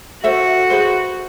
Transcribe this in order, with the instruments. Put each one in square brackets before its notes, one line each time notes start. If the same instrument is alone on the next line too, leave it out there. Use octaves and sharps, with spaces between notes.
[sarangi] F#4 [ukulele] A4 C5 E5
[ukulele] G#4 B4 C5